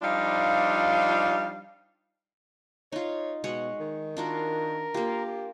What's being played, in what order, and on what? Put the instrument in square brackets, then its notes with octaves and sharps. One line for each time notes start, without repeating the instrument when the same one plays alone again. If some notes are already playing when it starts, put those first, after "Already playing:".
[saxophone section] F3 G3 D4 D#4 F4 F5
[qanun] D#4 F4 [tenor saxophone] C#5
[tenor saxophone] B2 [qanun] G#3 C#5 F#5
[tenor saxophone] D#3
[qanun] D4 F4 F#4 [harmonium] A#4
[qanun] A#3 F4 [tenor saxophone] G4